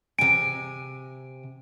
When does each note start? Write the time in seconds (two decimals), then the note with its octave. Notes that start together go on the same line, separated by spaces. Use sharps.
0.19 C3 G#5 D7